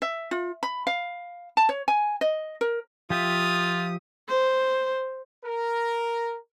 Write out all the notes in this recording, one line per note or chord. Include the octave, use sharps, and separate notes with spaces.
E5
F4
B5
F5
A5
C#5
G#5
D#5
A#4
F3 F4 G4 E5 D#6
C5
A#4